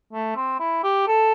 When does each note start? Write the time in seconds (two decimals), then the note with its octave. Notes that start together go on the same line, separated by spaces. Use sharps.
0.13 A3
0.37 C4
0.60 E4
0.84 G4
1.08 A4